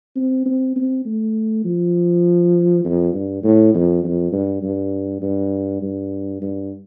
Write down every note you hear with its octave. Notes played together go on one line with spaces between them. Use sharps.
C4
C4
C4
A3
F3
F2
G2
A2
F2
F2
G2
G2
G2
G2
G2